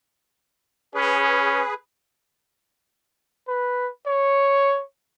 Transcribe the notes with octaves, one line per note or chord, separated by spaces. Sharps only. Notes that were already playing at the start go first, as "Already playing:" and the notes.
C#4 G#4 B4
B4
C#5